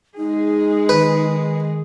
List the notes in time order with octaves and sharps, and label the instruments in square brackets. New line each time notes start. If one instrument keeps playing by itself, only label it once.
[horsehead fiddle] G#3 G#4 [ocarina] D#4
[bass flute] D#3 [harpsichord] B4